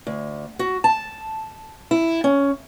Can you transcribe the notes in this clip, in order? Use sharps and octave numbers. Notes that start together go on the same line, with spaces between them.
D2
F#4
A5
E4
C#4